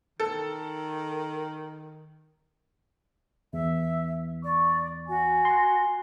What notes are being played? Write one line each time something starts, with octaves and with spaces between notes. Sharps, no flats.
D#3 A4
E2 E5
D5 C#6
F#4 G#5
C6